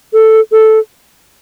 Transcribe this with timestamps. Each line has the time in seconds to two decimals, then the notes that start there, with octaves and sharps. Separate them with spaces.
0.13 A4
0.52 A4